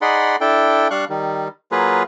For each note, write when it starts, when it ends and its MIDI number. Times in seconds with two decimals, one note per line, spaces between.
0.02 0.36 63
0.02 0.36 68
0.02 0.36 74
0.02 0.36 78
0.02 0.36 83
0.02 0.36 84
0.41 0.88 62
0.41 0.88 64
0.41 0.88 69
0.41 0.88 79
0.91 1.05 55
0.91 1.05 62
0.91 1.05 77
0.91 1.05 85
0.91 1.05 90
1.09 1.48 51
1.09 1.48 55
1.72 2.03 54
1.72 2.03 58
1.72 2.03 65
1.72 2.03 68
1.72 2.03 71